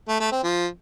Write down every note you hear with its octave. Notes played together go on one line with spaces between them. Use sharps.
A3
A3
C4
F3